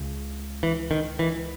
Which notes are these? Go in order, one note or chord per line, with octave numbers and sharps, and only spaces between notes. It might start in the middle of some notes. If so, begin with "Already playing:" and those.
Already playing: C#2 C#3
E3
D#3
E3